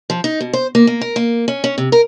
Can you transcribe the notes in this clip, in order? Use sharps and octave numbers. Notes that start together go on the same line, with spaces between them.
F3
D#4
B2
C5
A#3
A#3
A#4
A#3
C#4
C#4
C3
A#4